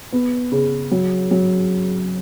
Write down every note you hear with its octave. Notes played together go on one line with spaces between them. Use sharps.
B3
C#3
F#3
F#3